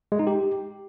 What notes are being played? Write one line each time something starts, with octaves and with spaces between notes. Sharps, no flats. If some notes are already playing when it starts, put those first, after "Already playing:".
G#3
D#4
G4